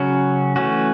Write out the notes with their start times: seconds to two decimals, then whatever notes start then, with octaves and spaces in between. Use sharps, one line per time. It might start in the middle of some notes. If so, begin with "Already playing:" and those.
Already playing: C#3 F#3 C#4 F#4
0.56 E3 A3 C#4 F#4